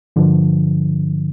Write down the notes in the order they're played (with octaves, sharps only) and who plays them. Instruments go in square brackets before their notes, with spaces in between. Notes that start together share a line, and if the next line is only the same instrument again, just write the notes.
[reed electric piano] G2 D3 F3